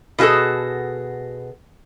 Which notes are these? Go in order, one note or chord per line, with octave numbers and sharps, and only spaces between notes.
B2 F4 F#4 G#4 A4